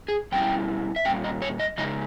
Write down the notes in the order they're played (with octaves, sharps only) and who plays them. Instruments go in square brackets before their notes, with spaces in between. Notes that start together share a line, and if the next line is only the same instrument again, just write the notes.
[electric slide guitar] G#4
B2 G3 C#4 E4 G5
E5
A#2 G3 C#4 G5
D#5
C#5
D#5
C#3 G#3 D#4 D#5